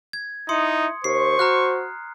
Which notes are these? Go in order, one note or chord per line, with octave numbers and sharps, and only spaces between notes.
G#6
D#4 E4 C6 D#6 C#7
D#2 C5 C#6 C7
F#4 A#5 F6 F#6